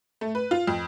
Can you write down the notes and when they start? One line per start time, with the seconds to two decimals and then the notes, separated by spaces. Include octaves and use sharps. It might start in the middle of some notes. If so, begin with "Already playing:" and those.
0.21 A3
0.35 B4
0.51 F4
0.67 F2